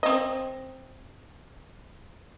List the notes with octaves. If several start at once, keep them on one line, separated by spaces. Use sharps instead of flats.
C4 D#5